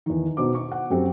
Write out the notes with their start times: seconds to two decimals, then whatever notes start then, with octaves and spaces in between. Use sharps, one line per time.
0.06 E2 D#3
0.37 B2 B3 D#4 C5 D6
0.55 C#6
0.72 F#5
0.90 F#2 C4 G4